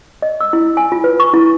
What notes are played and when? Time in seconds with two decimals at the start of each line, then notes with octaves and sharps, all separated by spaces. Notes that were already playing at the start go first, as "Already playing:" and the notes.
0.22 D#5
0.41 E6
0.53 E4
0.77 G#5
0.92 F4
1.04 B4
1.20 C#6
1.34 E4